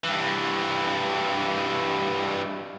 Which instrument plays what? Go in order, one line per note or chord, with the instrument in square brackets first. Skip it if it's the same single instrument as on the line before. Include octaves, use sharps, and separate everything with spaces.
[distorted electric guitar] G2 E3